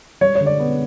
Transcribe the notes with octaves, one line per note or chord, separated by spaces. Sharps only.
G3 C#5
C#5
D3
D5
B3